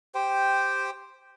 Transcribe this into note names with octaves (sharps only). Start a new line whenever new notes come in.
G4 C5 G5